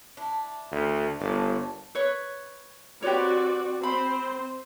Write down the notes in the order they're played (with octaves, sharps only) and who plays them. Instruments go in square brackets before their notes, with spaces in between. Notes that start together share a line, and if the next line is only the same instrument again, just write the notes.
[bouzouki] D4 E4
[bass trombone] D2
[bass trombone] G1 [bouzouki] A#3 C#4 A5
[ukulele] B4 C#5
[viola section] C4 F#4 D5 [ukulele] G4 B4 C#5
[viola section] C4 C5 [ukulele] B5